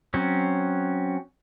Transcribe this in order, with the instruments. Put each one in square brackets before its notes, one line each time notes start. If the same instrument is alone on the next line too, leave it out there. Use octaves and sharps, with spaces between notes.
[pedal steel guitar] F#3 C4 C#4